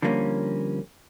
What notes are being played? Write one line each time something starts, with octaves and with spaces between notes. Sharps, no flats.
D3 F3 G3 A#3 C#4